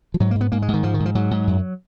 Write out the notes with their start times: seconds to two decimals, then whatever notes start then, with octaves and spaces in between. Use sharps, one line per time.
0.14 F3
0.20 G#2 F#3
0.31 A#3
0.35 G#2
0.41 B3
0.52 G#2 A#3
0.62 G#3
0.68 G#2
0.74 D#3
0.83 G#2 F3
0.94 D#3
1.00 G#2
1.05 F3
1.15 G#2 F#3
1.31 G#2
1.47 F#2